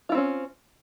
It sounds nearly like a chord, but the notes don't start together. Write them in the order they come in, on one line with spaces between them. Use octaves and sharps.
F4 E4 C4 C#4